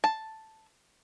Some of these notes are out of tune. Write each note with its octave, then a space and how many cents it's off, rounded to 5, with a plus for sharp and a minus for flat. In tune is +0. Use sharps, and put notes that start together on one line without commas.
A5 +0